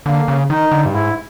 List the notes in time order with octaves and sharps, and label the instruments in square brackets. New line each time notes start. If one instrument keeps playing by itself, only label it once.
[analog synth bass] D3 [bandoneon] A#3
[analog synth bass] C#3
[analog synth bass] D#3 [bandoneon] D#4
[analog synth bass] D3
G2
[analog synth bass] G#2 [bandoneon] E4